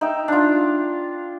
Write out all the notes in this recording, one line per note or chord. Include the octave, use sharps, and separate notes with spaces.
D#4 E5 G5
D4 F4